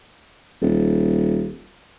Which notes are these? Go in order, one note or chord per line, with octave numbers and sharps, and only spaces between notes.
D#1